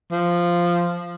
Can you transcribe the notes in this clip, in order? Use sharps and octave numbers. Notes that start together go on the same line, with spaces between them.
F3